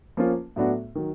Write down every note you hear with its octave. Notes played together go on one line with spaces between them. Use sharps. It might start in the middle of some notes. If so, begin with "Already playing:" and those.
F3 A#3 C#4 F4
A2 F#3 B3 D4 F#4
D#3 F#3